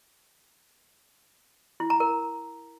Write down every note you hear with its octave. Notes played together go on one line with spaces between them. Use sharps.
E4
A#5
A#4